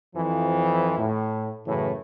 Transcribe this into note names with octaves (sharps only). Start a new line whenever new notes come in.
F2 E3 F3
A2
F#2 A2 C#3 E3